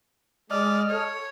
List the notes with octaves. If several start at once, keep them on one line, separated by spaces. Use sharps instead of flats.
G#3 D5 D#5 F6
A4 C#5